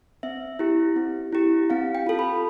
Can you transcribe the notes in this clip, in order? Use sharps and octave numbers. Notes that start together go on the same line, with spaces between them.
C4 E5
E4 G4
C4
E4 G4
C4 F5
G5
F4 A4
B5